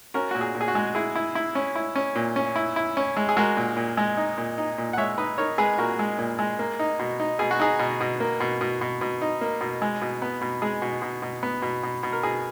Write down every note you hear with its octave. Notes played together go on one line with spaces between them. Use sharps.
C#4 F#4 A#4
A#2 F#4
G#4
A#2
G#4
F#4
G#3
E4 G#4
E4
E4
C#4
E4
C#4
A#2
C#4
E4
E4
C#4
G#3
G#4
G#3 F#4 A#4
A#2
A#2
G#3
D#4
A#2
D#4
A#2
F#5
G#3 C#5 E5
D#4 B4 D#5
D#4 A#4 C#5
G#3 G#4 B4
A#2 F#4 A#4
G#3
A#2
G#3
A#3
D#4
B2
D#4
B2 G#4
F#4
D#4 G#4
B2
B2
A#3
B2
B2
B2
B2
D#4
A#3
B2
G#3
B2
B3
B2
G#3 G#4
B2
B2
B2
B3
B2
B2
B2
A#4
B2 G#4